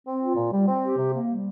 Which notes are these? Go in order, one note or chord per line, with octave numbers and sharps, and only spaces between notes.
C4
F4
A#2
G3
C4
G4
C3
A#3
G3